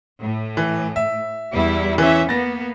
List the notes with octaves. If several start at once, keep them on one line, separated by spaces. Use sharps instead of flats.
A2
E3
E5
E2 G3 E4
E3 C#4 E4 E5
A#3 B3 A6 A#6